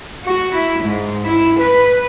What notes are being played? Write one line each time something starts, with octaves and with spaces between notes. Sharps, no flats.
F#4
E4
G#2
E4
B4